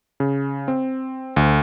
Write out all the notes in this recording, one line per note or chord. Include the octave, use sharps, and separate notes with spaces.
C#3
C4
D2